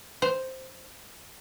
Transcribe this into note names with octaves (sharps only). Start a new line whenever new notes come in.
C5